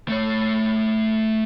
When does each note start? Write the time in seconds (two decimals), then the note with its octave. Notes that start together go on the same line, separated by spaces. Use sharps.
0.08 A3 C#5